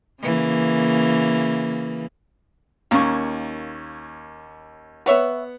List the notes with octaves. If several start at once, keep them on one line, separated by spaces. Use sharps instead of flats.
C#3 E3 A#3
D#2 D#3 A#3 C#4 C#6
B3 B4 C#5 E5 F#5